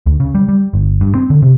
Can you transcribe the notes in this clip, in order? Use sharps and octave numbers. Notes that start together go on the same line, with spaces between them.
D2
C#3
G3
G3
G1
G2
C4
D3
C3